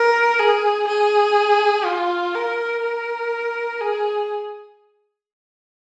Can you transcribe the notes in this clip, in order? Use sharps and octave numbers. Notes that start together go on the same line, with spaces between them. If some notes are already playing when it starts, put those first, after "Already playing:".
Already playing: A#4
G#4
G#4
F4
A#4
A#4
G#4